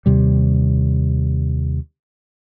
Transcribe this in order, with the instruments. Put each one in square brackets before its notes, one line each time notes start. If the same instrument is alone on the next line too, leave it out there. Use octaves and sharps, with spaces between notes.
[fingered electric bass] D#2 C3 G3